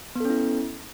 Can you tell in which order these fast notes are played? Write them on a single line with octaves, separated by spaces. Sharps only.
B3 A4 C#4 E4